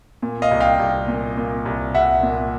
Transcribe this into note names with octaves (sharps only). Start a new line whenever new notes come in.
A#2
D#5 F5
C2
F5 G5
C2
A#2
A#2
C2
C2 E5 F#5
A#2